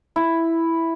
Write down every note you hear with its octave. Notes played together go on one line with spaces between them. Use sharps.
E4